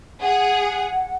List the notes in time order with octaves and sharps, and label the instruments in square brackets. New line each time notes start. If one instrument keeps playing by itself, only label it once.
[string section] G#4 [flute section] F#5